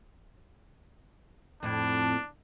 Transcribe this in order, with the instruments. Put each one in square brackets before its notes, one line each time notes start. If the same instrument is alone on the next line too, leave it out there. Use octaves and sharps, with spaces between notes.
[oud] F2 A2 [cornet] D4